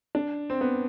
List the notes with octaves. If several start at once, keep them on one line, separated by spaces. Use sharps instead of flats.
D4
C4
B3